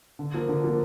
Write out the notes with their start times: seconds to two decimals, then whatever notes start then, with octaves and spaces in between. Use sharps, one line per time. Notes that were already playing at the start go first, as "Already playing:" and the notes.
0.19 D3
0.34 F3 A#3
0.49 D3
0.64 F3 A#3